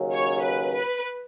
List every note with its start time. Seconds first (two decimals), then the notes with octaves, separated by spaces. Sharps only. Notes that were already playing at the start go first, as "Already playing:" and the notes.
Already playing: D#2 C#3 F#3 C#4
0.13 C#5
0.43 B4
0.74 B4